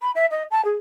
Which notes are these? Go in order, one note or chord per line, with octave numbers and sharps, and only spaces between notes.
B5
E5
D#5
A5
G#4